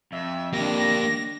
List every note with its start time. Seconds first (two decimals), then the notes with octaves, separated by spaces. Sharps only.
0.12 F2 E5
0.53 A#3 D4 G4 A#6